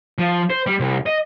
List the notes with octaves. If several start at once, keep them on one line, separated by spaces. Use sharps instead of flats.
F3
C5
G3
C2
D#5